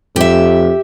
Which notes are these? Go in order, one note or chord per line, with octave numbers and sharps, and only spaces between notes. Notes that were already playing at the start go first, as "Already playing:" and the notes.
F2 G4 E5